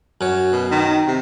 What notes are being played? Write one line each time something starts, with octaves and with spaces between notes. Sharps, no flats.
F#2 C#5
B2
D#3
C3